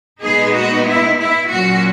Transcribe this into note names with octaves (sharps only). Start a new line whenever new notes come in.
A#2 G#3 B3 D#4 G#4
F#4
E4
E4
A#2 F#3 C#4 F#4